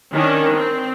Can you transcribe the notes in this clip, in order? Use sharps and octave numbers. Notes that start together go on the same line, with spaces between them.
D#3 C#4 D4
C4